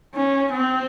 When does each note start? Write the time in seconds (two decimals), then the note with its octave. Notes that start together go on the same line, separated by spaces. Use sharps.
0.15 C#4
0.52 C4